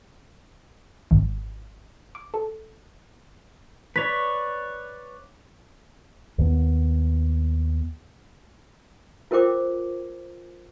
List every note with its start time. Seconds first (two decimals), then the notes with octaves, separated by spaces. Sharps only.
1.11 G#1
2.15 D6
2.34 A4
3.96 B4 C#5 D5 B6
6.38 D#2 B3
9.31 F4 A#4 C5 G5 D6